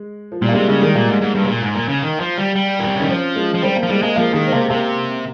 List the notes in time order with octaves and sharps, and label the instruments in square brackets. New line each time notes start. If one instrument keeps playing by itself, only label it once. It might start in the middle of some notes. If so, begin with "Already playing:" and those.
Already playing: [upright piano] G#3
F3
[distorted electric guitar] A#2 [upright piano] G3
[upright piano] A#3
[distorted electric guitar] C3 [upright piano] G#3
[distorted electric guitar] C#3 [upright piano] G3
[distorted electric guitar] D#3 [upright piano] G#3
[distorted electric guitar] A#2 [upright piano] A#3
[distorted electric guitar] G#2
G#2
G2
C3
A#2
G#2
A#2
C#3
D#3
F3
G3
G3
A#2
C3
C#3
[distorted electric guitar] D#3 [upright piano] C#4
[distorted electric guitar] F3 [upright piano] C4
[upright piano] G#3
[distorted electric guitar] F3
[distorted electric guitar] G3 [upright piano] C4
[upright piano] A#3
[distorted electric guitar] F3
[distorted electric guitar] G3 [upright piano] G#3
[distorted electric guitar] G#3 [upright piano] A#3
[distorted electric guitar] F3 [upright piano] A#3
[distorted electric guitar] D#3 [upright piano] G#3
[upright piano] C4
[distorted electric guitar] C3 [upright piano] A#3
[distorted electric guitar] C3 [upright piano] A#3